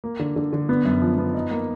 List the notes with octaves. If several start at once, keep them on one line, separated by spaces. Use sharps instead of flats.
A#3
D3
D3
D3
B3
F#2
F3
B3
D#4
A#3